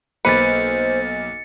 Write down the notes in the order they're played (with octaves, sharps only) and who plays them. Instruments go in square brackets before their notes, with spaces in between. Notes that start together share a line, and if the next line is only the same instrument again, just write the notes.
[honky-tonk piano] B1 A#3 D#7 [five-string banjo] B4 [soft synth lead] C5 [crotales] A6 C#7